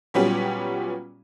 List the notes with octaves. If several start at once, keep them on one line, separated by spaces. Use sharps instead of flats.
A#2 F#3 G3 B3 C#4 G4